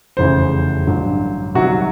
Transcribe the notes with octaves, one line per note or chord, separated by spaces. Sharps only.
F1 E2 C#3 E3 C5
A1 G2 D3 F#3
C2 C3 D#3 F#3 F#4